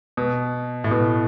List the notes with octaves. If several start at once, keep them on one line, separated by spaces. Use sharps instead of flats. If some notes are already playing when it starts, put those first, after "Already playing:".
B2
A2
B2